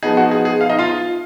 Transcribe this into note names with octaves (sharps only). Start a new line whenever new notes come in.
F3 B3 D#4 G#4
F#4
G#4
G#4
F5
D#4 D#5
F4 F5